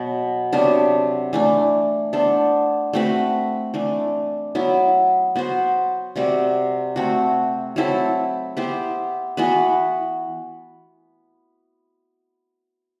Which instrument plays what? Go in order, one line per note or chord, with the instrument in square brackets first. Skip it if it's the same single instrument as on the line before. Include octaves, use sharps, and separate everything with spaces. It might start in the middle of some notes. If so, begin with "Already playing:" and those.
Already playing: [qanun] B2 F#3 B3
C3 F#3 B3 D4
E3 A3 D4
B3 D4 A4 C5
A3 C4 F#4 B4
E3 A3 D4
F#3 B3 E4
B3 F#4 C5
C3 G3 C4 F#4
A3 C4 F#4
F#3 C4 E4 A4
B3 E4 G4 C5
E3 B3 F#4 B4